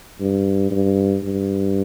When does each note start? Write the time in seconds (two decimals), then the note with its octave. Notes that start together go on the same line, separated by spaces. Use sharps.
0.20 G2
0.71 G2
1.23 G2